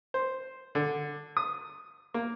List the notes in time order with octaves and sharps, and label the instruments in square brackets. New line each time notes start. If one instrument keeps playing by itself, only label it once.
[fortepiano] C5
D3
D#6
A#3